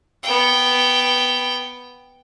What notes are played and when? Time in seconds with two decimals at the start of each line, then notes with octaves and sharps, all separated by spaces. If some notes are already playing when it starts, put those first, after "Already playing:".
0.23 B3 G5